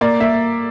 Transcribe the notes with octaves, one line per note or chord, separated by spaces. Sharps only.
A#3 D5
A#3 E5